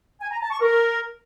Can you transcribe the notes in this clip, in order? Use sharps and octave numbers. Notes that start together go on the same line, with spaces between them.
G#5
A#5
A5
C#6
A#4